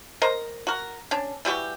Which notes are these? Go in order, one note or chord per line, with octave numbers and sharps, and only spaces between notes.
A#4 C5 D#5 A#5
F#4 A#4
C#4 D4
E3 G3 F#4 G4